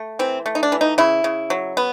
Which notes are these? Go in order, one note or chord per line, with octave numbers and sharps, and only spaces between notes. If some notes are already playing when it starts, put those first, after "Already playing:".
Already playing: A3
E3 C4
A3
D#4
D4
E3
D#4
C#3 E4
C#3
F#3
B3